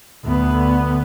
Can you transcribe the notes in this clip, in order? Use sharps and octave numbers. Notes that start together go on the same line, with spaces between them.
D2 B3